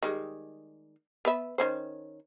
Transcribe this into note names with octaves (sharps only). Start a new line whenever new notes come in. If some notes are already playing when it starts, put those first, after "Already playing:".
D#3 G3 G#3
B3 B4 E5
D#3 C#4 C5